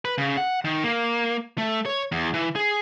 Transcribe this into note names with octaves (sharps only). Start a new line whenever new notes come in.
B4
C#3
F#5
D#3
A#3
A3
C#5
E2
E3
G#4